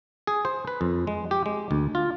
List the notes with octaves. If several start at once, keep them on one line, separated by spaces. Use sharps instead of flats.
G#4
C5
B4
F2
G#3
G4
G#3
D2
F4